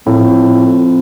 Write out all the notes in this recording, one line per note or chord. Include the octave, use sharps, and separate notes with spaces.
F2 A2